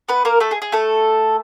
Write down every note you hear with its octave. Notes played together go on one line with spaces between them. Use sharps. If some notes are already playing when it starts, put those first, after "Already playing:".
B3 B4
A#3 A#4
A3 A4
G#4
G#4
A3 A4